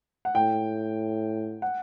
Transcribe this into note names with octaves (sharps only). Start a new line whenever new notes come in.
F#5
A2 G5
F#5